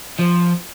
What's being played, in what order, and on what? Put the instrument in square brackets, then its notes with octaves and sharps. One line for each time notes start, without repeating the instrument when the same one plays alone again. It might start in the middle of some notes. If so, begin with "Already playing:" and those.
[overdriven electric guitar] F3